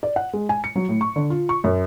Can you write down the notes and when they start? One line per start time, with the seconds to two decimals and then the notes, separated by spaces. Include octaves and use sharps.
0.03 D5
0.16 F#5
0.33 G#3
0.49 G#5
0.64 C#7
0.76 F#3
0.89 A2
1.01 C#6
1.16 D3
1.30 F4
1.49 C#6
1.64 F#2